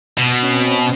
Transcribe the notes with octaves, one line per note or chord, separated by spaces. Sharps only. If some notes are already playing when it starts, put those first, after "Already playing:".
B2 B3
C#4
C4